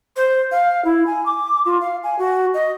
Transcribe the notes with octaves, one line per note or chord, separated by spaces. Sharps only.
C5
F5
E4
G#5
D6
F4
F5
G#5
F#4
D#5